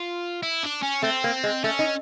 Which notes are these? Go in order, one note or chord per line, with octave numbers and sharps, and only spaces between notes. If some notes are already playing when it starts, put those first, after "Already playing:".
Already playing: F4
E4
D4
C#4
A3 C4
A#3
G#3
A3 C#4
D#4